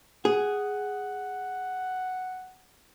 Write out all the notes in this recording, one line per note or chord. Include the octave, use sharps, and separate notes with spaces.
G#4 F#5